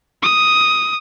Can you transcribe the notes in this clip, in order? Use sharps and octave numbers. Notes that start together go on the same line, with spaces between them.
D#6